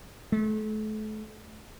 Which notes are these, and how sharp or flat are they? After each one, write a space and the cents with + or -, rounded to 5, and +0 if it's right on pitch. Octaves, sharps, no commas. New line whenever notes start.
A3 -35